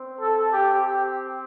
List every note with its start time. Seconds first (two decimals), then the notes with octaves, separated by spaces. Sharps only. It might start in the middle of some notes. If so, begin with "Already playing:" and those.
Already playing: C4
0.19 A4
0.51 G4
0.82 G4